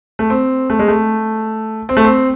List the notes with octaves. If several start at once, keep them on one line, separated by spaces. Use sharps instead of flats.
A3
C4
A3
G#3
A3
C4
A3
C4